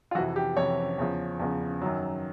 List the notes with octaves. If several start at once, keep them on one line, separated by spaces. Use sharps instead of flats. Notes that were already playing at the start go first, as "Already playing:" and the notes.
F4
F2 C3 E3 F#4
G4
F2 C3 E3 C#5
E2 C#3 F3
E2 C#3 F3
F#2 D#3 F#3